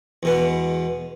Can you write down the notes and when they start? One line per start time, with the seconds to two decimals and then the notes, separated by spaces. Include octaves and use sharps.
0.23 E2 B2 G#3 B3